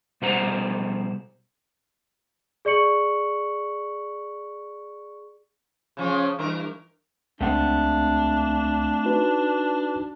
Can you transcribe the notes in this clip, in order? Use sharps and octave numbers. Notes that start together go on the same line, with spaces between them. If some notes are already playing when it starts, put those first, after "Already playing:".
B2 G3 C5 F#5 A#5
G#4 D5 C#6 C#7 F#7
C#3 F3 C#4
G2 E3 A#4
C#2 A3 C4 D4 F#5
D#4 F#4 B4